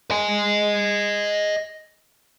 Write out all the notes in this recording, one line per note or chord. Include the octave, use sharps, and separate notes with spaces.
D#5 G#5